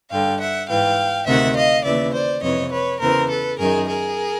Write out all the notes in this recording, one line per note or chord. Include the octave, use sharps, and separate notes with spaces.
G2 D3 F5 G5
E5 F#5
G#2 E3 F5 G5
D2 C3 D#3 E5 F#5
D#5 F5
D#2 C#3 E3 D5 E5
C5 D5
F2 C3 E3 C#5 D#5
B4 C#5
E2 C#3 E3 A#4 C5
A4 B4
F#2 D#3 G#4 A#4
G#4 A#4